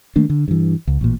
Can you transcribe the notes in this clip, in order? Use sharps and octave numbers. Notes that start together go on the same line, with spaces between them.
D#3 A3 A#3 D4
D3
G2 E3
C#2
A1 A#2